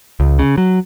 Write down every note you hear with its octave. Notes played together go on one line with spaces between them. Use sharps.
C#2
C#3
F#3